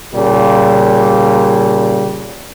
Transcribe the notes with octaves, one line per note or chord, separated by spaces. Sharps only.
A#2 C#3 G3